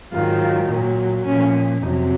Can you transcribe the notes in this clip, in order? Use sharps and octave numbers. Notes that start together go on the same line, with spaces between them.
G#2 D#3 F#3 F4
A#2 F#3
A#2 F3 C#4
F2 C3 F#3 D#4